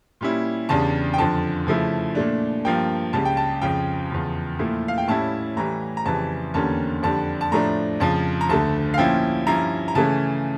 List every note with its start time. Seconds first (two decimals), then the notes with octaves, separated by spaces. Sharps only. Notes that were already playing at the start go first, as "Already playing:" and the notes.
0.21 A#2 G3 C#4 E4
0.69 E2 C#3 G3 D4 A5
1.14 G5
1.18 F2 D3 F3 A5
1.67 C#3 F3 A3 E4
2.15 A#2 A3 D4
2.65 G2 F3 A#3 G5
3.13 C#2 C#3 G3 A5
3.25 G5
3.37 A5
3.62 F2 C#3 F3 G5
4.10 E2 C#3 F3
4.59 A#2 F3 A3 E4
4.88 F5
4.98 G5
5.08 A2 G3 C#4 E4 A5
5.56 A2 E3 G3 A#5
5.97 A#5
6.05 F2 C#3 E3 G3 A5
6.54 E2 D3 G3 A#3 C#4 A5
7.03 F2 D3 G3 D4 A5
7.41 A5
7.52 A2 F3 A3 D4 A#5
8.00 F2 C#3 F3 A5
8.41 A#5
8.49 D2 D3 A3 A5
8.94 F5
8.98 A#2 F3 C#4 E4 G5
9.47 G2 F3 C#4 E4 A#5
9.88 A#5
9.95 C#3 E3 A3 C#4 A5